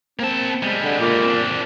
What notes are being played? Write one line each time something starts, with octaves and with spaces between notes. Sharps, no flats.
A#3 C4 A5
G3 G#3
D3
A#2
C4 D4